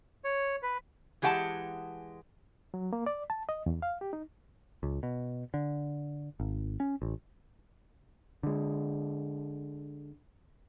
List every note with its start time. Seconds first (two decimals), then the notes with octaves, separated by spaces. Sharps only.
0.24 C#5
0.62 B4
1.22 E3 G#3 G4 F#5 G#5 A5
2.74 F#3
2.93 A#3
3.06 D5
3.30 A5
3.49 D#5
3.66 E2
3.82 F5
4.01 G4
4.13 D#4
4.83 C#2
5.03 B2
5.54 D3
6.40 G#1
6.80 C#4
7.02 A1
8.43 D3 G#3